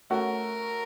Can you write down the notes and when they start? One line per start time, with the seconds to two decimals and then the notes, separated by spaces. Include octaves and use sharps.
0.10 A3 C#4 F#4 A#4